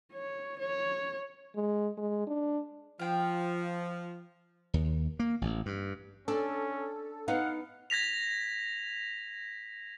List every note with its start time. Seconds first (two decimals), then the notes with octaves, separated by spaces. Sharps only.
0.13 C#5
0.59 C#5
1.56 G#3
1.98 G#3
2.27 D4
2.99 F3 F5 G5
4.74 D#2
5.19 A#3
5.41 A1
5.66 G2
6.28 C#4 D4 A4
7.28 B3 D#4 F5 F#5
7.90 G#6 A#6 B6 F7